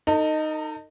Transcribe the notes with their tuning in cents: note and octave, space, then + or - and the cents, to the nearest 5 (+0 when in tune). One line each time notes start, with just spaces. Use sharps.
D#4 -5 A4 +40